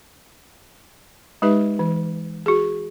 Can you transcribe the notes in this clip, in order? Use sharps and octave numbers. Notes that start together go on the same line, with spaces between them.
G#3 D#4 G4 B4 E5
E3
F#4 G#4